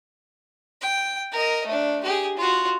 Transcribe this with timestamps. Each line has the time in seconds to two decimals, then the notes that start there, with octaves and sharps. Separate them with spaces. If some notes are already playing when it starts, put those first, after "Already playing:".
0.81 G5
1.32 A#4 D#5
1.67 A3 D4
2.04 G4 G#4
2.37 F4 F#4